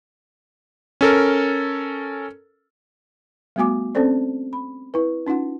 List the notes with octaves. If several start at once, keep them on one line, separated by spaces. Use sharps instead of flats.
C#4 A4 A#4
G3 A3 B3 F#4 G#5 D6
C4 C#4 A4 C5 D5
B5
E4 B4
C#4 D#4 F4 F#5 C6